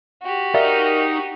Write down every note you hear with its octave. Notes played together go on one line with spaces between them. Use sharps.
F#4 G4
D#4 A#4 D5 E5 F5